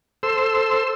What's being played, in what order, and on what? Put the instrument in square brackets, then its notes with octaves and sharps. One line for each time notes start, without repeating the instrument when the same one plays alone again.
[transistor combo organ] A4 C5 C6 E6